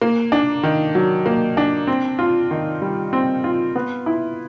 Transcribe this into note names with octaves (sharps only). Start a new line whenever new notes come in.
A#3
D4
D#3
F#3
A#3
D4
C4
F4
D#3
G3
C4
F4
B3
E4